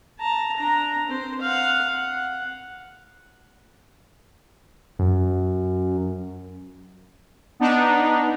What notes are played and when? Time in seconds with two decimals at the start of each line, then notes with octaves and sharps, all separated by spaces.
0.19 A5 A#5
0.57 D4 A#5
1.06 C4 C5
1.41 F5 F#5
1.87 F#5
4.99 F#2
7.60 B3 D4 D#4